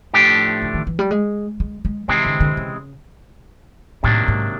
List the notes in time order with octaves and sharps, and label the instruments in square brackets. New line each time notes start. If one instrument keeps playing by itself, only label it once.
[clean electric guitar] A2 F3 A3 D4 G4
[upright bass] D3
D#3
E3
G3
G#3
G#3
G#3
[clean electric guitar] C3 E3 G#3 C4 [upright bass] D#3
[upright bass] D3
D3
C#3
[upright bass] A2 [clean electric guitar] C3 D#3 F#3 A#3 D4
[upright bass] G#2